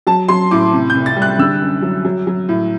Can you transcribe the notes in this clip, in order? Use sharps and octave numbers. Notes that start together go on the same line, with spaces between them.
F#3 A5
F#3 C6
A2 D6
C3
G6
C2
A6
G3
F#6
D3 E6
F#2
F#3
F#3
F#3
A2